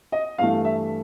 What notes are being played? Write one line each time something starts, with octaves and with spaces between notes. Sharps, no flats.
D#5
G2 E3 A3 F5
E5